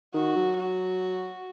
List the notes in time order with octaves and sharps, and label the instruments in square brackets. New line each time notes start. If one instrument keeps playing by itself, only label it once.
[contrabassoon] D#3 [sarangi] F#4
[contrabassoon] F#3
[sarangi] F#4